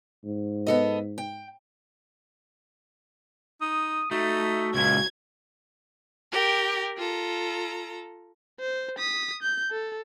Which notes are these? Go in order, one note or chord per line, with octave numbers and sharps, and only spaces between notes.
G#2
B3 A4 D#5
G5
D#4 D#6
A3 D#4 F#4
C#2 A#2 G#6
G4 A#4 G5
F4 A4 A#5
C5
D#6 B6
G6
A4